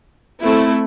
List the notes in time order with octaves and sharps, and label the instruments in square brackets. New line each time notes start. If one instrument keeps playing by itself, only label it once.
[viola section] A3 C4 E4